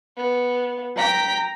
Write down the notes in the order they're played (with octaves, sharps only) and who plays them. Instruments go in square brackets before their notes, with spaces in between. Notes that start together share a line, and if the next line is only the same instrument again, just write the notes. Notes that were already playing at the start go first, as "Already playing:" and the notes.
[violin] B3
[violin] G5 B6 [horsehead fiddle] A#5